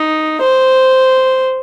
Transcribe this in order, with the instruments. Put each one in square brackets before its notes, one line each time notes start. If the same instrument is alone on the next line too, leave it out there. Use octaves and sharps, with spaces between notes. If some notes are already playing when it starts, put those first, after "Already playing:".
Already playing: [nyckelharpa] D#4
C5